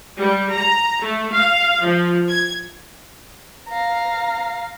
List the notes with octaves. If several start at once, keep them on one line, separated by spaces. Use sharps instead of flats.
G3
A#5
A3
F5
F3
G#6
F5 A#5